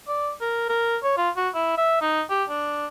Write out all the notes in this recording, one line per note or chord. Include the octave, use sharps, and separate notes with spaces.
D5
A#4
A#4
C#5
F4
F#4
E4
E5
D#4
G4
D4